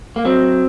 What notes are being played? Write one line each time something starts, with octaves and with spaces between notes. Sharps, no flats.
A#3
F#3 C4